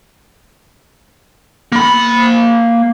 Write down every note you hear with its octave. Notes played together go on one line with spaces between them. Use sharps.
A#3 B5